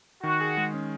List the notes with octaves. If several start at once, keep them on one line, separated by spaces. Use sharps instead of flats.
D#3 F#4
G#4
G#3
C#4